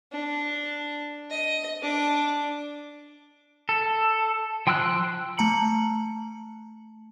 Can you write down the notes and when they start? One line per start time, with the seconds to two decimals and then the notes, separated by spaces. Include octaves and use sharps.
0.12 D4
1.30 D#5
1.82 D4 D6
3.69 A4
4.67 F3 G5 C6 E6 F#6
5.38 A3 A5 A#5 C#7 F#7